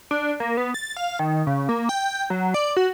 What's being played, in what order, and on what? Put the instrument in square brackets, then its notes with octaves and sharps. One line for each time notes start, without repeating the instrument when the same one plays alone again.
[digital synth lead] D4
A#3
B3
A6
F5
D#3
C#3
A#3
G5
F#3
D5
F#4